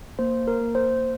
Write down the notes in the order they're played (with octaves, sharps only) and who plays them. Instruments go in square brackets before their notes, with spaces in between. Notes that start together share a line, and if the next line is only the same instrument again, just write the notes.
[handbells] A#3 C5
A#4
A#3
C5